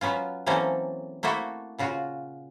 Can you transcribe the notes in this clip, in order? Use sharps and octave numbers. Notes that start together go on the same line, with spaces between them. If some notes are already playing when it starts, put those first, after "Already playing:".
F#3 B3 C#4 F4
E3 F#3 A#3 C4 C#4 A4
A3 A#3 E4 F#4 A4
A#2 C#3 F4 F#4